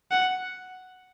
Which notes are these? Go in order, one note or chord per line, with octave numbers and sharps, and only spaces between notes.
F#5